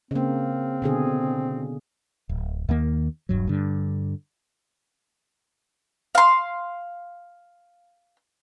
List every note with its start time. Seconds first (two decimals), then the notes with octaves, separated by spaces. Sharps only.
0.11 C#3 A#3 C4
0.82 B2 D3 G#4
2.29 D1
2.69 D#2 D#3 A#3
3.29 D#1 G2 F#3
3.47 G2 D3
6.15 F5 C6